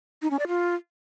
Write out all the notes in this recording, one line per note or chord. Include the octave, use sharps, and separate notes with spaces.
D#4
C#4
D5
F4